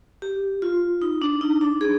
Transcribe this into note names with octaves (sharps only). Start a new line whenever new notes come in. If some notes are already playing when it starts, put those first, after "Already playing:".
G4
F4
D#4
D4
D#4
D4
G#4